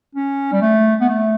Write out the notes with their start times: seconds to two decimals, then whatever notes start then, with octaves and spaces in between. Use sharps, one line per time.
0.15 C#4
0.52 G3
0.61 A3
1.00 B3
1.08 A3